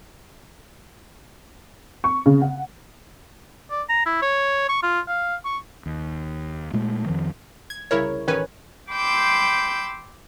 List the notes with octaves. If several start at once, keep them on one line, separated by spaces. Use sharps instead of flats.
C#6
C#3
F#5
D5
A#5
E4
C#5
C#6
F4
F5
C#6
D#2
A#2 G#3 A3
F2 D#3 F3
G#6
C2 C#3 E4 A#4 C#5
A1 D#3 C#4 B4 C#5 G#5
G5 B5 C6 D6 E6 G6